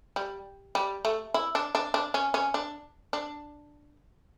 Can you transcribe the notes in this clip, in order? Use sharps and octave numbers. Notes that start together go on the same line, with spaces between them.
G3
G3
A3
E4
D4
D4
D4
C#4
C#4
D4
D4